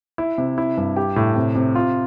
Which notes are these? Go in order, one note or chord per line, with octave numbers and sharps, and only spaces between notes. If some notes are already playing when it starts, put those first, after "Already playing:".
E4
C3
E4
G2
G4
A2
C3
C3
F4